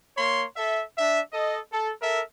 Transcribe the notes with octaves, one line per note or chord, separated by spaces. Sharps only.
A#3 C#5 C6
A4 E5
D4 E5
A4 D#5
A4
A4 A#4 E5